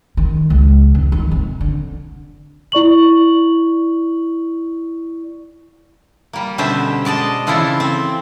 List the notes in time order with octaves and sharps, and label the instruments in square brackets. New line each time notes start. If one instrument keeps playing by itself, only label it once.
[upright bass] D#3
C#2
F1
D#3
C3
D3
[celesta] E4 D5 C#6 F#7
[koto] G3 A#3
B2 D3 G3 C#4 C5 E5
G#3 D5 D#5 A5
C#3 E3 C4 E4 F4 A4
C4